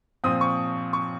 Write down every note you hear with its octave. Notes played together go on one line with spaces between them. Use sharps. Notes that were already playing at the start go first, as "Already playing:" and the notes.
A#2 F3 C4 D#6
C#6
C#6